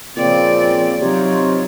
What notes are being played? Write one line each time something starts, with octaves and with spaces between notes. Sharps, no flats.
A#2 C#3 F3 C4 D5
C3 F#3 C4 D#4 F4 C#5